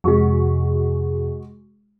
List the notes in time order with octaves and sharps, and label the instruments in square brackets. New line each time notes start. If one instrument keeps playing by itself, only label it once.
[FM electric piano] F2 C3 [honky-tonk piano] G#3 F#4 C#6